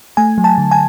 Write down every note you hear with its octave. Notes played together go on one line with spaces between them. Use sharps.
A3 G#5
F#3
A5
D3
G#5